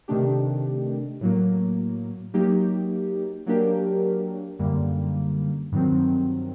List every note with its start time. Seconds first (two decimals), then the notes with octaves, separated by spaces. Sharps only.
0.08 C3 D#3 A3 D4 G4
1.21 A2 F#3 A#3
2.34 F#3 A#3 D#4 G4
3.46 F#3 A#3 D4 G4 A#4
4.59 F#2 D3 G3 A#3
5.72 G2 D#3 F#3 C4